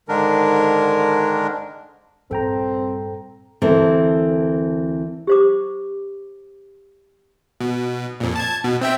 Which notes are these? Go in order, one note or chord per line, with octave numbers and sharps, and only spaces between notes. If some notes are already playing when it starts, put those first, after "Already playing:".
G#2 D3 D#3 G#3 D4 A#4
A#1 G2 C4 A4 G5 A#5
D2 E3 C4 A4 A#4
G4 C5 D6
B2
F2 A#2
A5 G#6
B2
C4 E5 G5